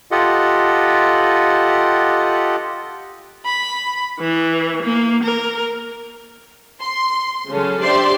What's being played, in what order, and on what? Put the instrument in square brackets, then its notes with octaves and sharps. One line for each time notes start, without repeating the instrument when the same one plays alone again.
[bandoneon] F4 G4 A4 D#5 F#5
[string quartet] B5
E3
A#3
A#4
[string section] C6
C#3 F#3 C#4 A4
D4 G4 C5 D5 E5 C6